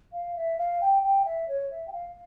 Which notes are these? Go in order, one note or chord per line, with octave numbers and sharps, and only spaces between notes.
F5
E5
F5
G5
G5
E5
C#5
E5
G5
F5